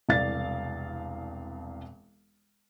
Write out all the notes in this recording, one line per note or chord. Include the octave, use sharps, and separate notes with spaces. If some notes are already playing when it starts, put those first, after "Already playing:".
E1 C2 D5 F5 A6